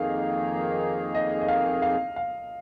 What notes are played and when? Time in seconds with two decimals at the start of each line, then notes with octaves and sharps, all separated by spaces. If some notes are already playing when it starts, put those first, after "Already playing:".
Already playing: F2 D#3 A#3 D#4 G#4 F5
1.15 D#5
1.42 D#5
1.48 F5
1.82 F5
2.16 F5